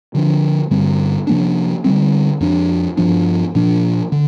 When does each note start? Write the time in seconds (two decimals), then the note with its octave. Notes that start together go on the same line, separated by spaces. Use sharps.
0.15 D3 F3 D4
0.71 G2 D3 G3 C4
1.27 C3 F3 A#3 D4
1.84 D3 G3 C4
2.41 F2 F3 D4
2.97 G2 F3 D4
3.55 A#2 F3 D4
4.12 D3